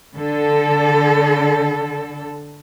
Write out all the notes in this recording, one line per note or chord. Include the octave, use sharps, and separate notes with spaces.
D3 A4